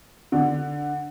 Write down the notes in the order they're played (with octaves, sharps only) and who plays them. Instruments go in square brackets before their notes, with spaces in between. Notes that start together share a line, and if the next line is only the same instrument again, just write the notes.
[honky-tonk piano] D3